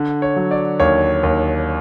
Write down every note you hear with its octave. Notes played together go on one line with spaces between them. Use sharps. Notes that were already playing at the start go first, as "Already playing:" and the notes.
Already playing: D3
C#5
F#3
D5
D#2 C#5
D#2